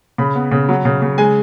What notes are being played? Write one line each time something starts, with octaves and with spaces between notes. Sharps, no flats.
C#3 B5
B3
C#3
F#3
C#3
C#3
G#3 G#5